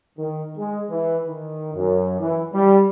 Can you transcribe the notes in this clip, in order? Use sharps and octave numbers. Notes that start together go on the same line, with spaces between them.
D#3
G#3
E3
D#3
F#2
E3
G3